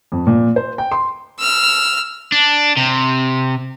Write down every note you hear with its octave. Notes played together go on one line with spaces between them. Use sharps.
F2
A#2
C5
G5
C6
E6 F6
D4
C3